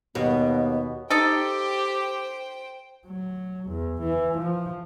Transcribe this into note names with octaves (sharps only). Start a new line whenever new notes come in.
D#2 B2 B3
D#4 G4 A4 C5 G5
F#3
E2
E3
F3